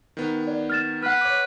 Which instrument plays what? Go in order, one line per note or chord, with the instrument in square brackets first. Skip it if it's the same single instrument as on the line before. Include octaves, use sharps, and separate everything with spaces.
[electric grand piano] D#3 B3
[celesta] D5
F6 A6 E7
[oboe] B4 [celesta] F#5 F6
[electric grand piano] C#5 D6